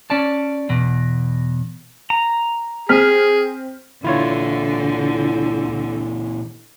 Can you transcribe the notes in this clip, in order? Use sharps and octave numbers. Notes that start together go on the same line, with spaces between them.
C#4 D5 A5
E2 B2
A#5
C4 G#4 F6 B6
A#2 D3 E3 E4 F4 C#5